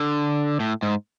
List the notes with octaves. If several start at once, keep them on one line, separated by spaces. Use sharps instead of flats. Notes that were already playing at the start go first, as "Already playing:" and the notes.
Already playing: D3
A2
G#2